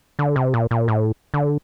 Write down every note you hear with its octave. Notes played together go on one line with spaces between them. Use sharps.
D3
C3
A#2
A#2
A2
D3